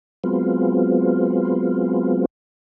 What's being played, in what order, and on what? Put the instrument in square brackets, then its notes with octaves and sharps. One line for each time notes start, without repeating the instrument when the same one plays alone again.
[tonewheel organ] F#3 G#3 B3 C4 F4